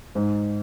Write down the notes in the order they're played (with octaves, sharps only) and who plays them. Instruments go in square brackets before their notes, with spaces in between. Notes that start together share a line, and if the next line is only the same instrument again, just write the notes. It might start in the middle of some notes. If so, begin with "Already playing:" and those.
[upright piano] G#2